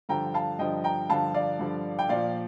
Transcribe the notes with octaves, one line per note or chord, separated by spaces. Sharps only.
G2 D3 F3 G5 A#5
F5 A5
G2 D3 F3 D#5 G5
G5 A#5
G2 D3 F3 F5 A5
D5 F5
G2 D3 F3
G5
A#2 F3 D5 F5